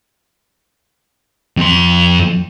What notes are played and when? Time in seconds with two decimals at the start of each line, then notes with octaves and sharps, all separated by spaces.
1.57 F2 C6